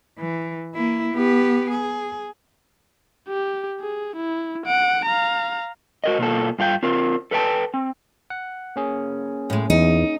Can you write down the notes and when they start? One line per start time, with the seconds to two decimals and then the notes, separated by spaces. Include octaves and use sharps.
0.19 E3
0.75 A#3 E4
1.14 B3 G4
1.71 G#4
3.28 G4
3.80 G#4
4.16 E4
4.66 F#5 D7
5.06 F5 A#5
6.04 F#4 A#4 D#5
6.18 B2 A#3 F4 A4
6.59 G2 F4 G#4 G5
6.83 C4 F4 A#4
7.31 A4 B4 D#5 G5 A5
7.74 C4
8.30 F#5
8.76 A#3 C#4 G#4
9.50 A2 G#3
9.70 E2 D#4